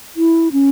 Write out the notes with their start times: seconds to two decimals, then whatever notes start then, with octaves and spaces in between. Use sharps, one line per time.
0.16 E4
0.52 C#4